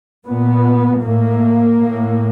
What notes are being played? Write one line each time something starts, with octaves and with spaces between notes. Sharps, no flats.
A#2 B3
A2 A#3
A2